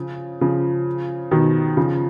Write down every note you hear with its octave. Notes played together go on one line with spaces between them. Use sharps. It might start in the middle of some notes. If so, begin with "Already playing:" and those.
Already playing: C#3 F3
C#3 F3
B2 D#3
C#3 F3